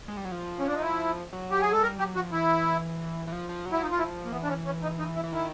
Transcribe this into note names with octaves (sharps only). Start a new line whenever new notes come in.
G#3
G3
F#3
F3
C#4
D4
D#4
E4
F#3
G4
G#4
G#3 A4
G3 A#4
F#3 G4
F3 F#4
E3 E4
E3
F3
F3
F#3
E4
F3 D#4
F4
E4
A#3
E3 B3
D4
C#4
C#4
D#4
D#4
E4
E3
D#3 E4